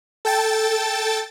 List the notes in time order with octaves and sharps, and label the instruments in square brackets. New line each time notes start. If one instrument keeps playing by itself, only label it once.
[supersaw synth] A4 G5 A5 A6